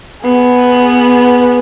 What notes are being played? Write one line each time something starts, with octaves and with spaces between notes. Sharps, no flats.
B3 G#4